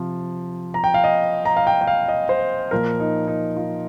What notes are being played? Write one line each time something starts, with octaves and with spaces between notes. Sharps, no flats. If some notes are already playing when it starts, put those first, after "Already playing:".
Already playing: C3 F3
A#5
G5
F5
D#5
A#5
F5
G5
G5
F5
D#5
C5
A#2 F3 A#4
D#4
D#4
F4